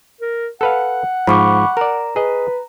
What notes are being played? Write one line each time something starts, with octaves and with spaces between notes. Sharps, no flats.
A#4
A4 B4 F5 F#5
G#2 F3 B5 C#6 D6
A#4 D5 A#5
G#4 B4 D#5